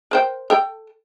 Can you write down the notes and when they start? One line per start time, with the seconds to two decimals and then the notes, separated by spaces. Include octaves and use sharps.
0.11 A#4 C5 G5
0.50 A4 G5